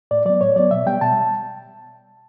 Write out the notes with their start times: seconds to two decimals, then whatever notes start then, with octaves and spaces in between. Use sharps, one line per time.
0.11 A2 D5
0.25 F#3 B3 D5
0.41 A2 C#5
0.56 F#3 B3 D5
0.71 B2 E5
0.86 G3 B3 G5
1.01 B2 A5